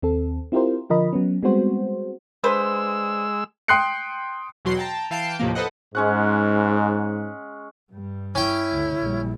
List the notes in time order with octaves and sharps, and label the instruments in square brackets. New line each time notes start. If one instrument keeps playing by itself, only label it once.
[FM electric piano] D#2 C4 A4
C4 E4 F4 G4 A#4 C5
D3 F3 F4 A#4 D#5 B5
F#3 B3 C#4
G3 G#3 B3 C4 F#4 C5
[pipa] D3 B4 C5 [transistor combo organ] G#3 E6
[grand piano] G5 C6 D#6 F#6 C7 C#7
[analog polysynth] E2 B2 F#3 F#4 C6 C7
G5 A5 A#5
E3 F5 G5 A5 C7 D7
D#2 A2 C3 F3 A#3
A4 B4 C5 D#5 F#5
[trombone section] G#2 [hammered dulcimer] G#3 C#4 F#5
[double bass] G2 G3
[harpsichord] C#4 G5 [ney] E4
[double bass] D2 D3
A#1 G3